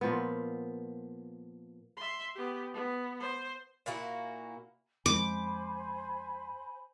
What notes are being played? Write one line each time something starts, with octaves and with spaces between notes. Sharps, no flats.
A#2 F3 B3
E5 C6
B3 G4
B3
C5
A#2 A#3 E4 F#4
F2 F3 G#3 C5 G#5 B5 D6